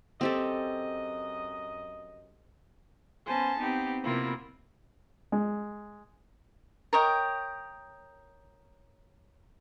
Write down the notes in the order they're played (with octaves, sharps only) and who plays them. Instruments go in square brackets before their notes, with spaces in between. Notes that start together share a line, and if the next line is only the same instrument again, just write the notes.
[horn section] F#2 D#5 [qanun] C4 G4 A4
[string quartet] B3 C#4 C5 G#5 A5
B3 C4 D#4 G4
C3 A#3 B3 E4 F4 A#4
[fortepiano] G#3
[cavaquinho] A#4 C#5 D#5 G5